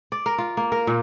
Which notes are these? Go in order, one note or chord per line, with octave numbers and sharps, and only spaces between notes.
D5
A#4
F4
A#3
A#4
A#2